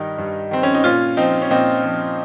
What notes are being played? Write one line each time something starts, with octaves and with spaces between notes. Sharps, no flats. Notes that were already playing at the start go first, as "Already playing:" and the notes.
Already playing: G2 D#3 D#4
G2
D#3 C4
C#4
D#4
A#2 C#4 F4
F3 C4 D#4
C#4
A#2 C4 D#4
F3